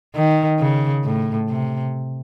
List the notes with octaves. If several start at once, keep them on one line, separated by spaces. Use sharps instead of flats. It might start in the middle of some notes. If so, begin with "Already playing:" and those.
D#3
C#3
A2
C3